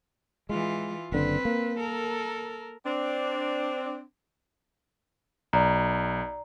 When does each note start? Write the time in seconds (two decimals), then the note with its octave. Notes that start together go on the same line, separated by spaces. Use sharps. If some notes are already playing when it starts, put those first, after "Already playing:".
0.49 E3 G#3 F4
1.12 F#1 D3 C4 B4
1.45 A#3
1.80 A4 A#4
2.86 C4 D4
5.53 B1 D5 A#5